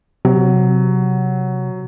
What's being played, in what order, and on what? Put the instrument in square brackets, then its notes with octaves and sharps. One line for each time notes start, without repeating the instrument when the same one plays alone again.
[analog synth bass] C3 [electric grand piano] F#3